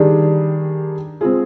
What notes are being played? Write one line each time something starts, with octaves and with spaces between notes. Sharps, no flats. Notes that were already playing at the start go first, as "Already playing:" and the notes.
Already playing: D#3 G3 D4 G#4
G#3 C4 F4 G#4